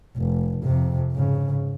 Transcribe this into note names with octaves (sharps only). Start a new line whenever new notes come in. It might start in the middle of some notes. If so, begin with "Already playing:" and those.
F1
F2 C3
G#2 C#3